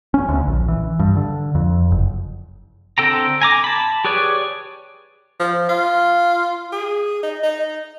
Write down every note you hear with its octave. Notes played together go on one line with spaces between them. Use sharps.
C#4
D2
A#1
E3
G2
D3
F2
F#1
D3 C4 A4 G5 A#5
G#5 A#5 D6
A5 B5
G4 G#4 B4 C#5 D5
F3
F4
G#4
D#4
D#4